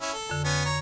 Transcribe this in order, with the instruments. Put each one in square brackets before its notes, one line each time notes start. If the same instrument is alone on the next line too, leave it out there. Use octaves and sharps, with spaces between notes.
[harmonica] C#4 E4 E5
A4
[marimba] F2 D3
[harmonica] B3 C#4
C#5 A#5